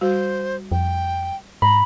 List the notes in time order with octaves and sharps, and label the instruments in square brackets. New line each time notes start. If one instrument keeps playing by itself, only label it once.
[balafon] G3 F#4 [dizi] C5
[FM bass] F2 [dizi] G5
[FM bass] G#2 [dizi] A#5 [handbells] B5